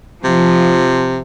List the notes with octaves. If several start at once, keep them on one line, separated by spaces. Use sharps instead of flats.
C3 F3